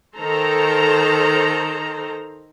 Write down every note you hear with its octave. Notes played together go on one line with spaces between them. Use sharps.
D#3 A4 C5 A#5